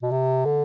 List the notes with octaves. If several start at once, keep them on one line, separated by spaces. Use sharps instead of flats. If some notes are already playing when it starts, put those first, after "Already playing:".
B2
C3
D3